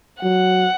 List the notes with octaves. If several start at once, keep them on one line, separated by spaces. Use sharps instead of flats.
F#3 F#5